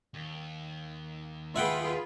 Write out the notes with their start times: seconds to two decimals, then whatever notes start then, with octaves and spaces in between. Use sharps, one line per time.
0.14 D#2
1.56 F4 G#4 B4 E5 F#5 G5